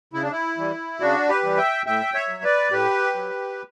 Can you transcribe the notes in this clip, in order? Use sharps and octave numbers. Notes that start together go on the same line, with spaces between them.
C#3 E4
D4
E4
E3 G3
C#3 D4 F#4
G4 B4
E3 G3
E5 G5
A2 E5 G5
C#5 E5
F#3
B4 D5
A2 G4 B4
F#3